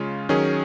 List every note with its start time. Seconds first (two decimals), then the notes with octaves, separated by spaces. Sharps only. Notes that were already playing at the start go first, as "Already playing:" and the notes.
Already playing: C#3 G#3 C#4 F4
0.29 D#3 F#3 C#4 G#4